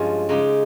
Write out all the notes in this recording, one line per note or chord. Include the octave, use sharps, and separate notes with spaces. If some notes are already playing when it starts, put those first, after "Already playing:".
Already playing: G2 F3 G#3 C#4 F4
C#3 G#3 D#4 G4